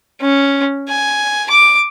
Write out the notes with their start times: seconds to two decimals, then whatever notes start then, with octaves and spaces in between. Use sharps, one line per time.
0.21 C#4
0.89 G#5
1.50 D6